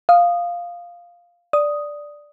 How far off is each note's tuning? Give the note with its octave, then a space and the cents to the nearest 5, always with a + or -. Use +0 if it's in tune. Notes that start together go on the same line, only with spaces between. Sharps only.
F5 +0 D#6 -10
D5 +0 D#6 +0